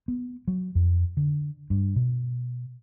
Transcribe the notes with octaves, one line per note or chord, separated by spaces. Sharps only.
B3
F#3
F2
D3
G2
B2